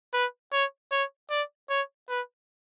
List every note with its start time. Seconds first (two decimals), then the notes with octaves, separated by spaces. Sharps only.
0.14 B4
0.53 C#5
0.92 C#5
1.30 D5
1.70 C#5
2.09 B4